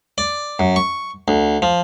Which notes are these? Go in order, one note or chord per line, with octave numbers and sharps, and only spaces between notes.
D5
F#2
C#6
D2
F3